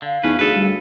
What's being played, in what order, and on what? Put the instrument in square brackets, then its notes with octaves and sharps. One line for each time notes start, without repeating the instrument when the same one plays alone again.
[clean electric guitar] D3 [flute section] F5
[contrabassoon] E2 [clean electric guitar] A3 C#4 B4 [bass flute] D#4
[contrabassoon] D2 [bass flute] G#4 [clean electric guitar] A4 B4
[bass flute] G3